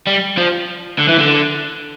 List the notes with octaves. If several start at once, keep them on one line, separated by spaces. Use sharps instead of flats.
G3
F3
D3
E3
D3